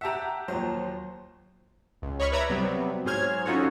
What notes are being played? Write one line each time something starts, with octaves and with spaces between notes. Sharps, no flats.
G4 E5 F#5 A5 A#5
D#2 F3 F#3 C5
C#2
C#5 D#5 B5 C#6 F6
B4 D5 E5 A#5 B5 G#6
C3 F#3 G3 B3 C4
G#2 F#3 G#4 C5 F6 G#6
C#4 D#4 F4 F#4 A4 C#5